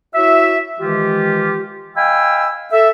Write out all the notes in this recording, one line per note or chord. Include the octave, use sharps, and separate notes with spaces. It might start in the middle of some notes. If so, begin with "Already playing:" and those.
E4 F#4 C#5 E5
D#3 E3 G#3 F4 G4
D#5 F5 G5 G#5 B5 E6
A4 E5